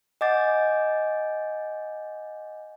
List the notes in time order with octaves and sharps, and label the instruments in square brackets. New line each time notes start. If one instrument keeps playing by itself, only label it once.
[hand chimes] D#5 F#5 G#5 D6 G6 A6